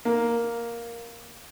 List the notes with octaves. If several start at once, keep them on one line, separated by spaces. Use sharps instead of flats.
A#3